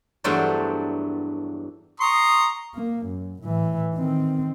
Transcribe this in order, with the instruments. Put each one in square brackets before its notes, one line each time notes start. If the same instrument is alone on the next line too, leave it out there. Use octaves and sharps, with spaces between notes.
[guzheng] E2 G2 F#3 A3 D4 C5
[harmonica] A#5 C6 C#6 [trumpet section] D#6
[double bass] A#3
F#2
A2 E3
D#3 C4